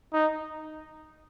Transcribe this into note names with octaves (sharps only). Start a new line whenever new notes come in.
D#4